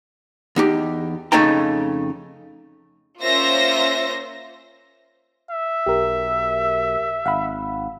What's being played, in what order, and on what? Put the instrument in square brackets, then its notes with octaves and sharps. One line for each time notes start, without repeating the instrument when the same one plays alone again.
[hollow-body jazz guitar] E2 D#4 G4
F2 C#3 A3 D#4 G5 A#5
[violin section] A#3 C#4 F4 C5 E5 A#6
[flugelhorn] E5
[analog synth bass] B1 [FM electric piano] G4 A#4
[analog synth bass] G#1 [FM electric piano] F5 F#5 B5